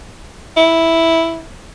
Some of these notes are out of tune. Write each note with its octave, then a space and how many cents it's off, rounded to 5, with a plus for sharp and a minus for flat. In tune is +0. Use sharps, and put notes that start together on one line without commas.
E4 -5